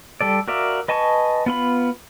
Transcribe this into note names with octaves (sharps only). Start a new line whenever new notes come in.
G3 A4 D5
F#4 A#4 D5 E5 F5
B4 D#5 G#5 A5 C#6
B3 F4 B5